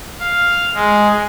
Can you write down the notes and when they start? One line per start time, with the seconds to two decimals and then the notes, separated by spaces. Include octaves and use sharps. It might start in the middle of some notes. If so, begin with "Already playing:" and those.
0.20 F5
0.75 G#3